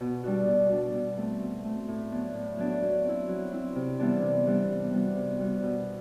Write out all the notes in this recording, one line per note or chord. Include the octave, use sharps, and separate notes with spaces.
B2
G3 D4 F#4
B2
G3 D4 F#4
B2
A3 C4
B2
A3 C4
A2
F#3 B3 D4
A2
F#3 B3 D4
F#3
C4 E4
F#3
C4 E4
C3
E3 G3 B3 D4
C3
E3 G3 B3 D4
C3
G3 B3 F#4
C3
G3 B3 F#4
B2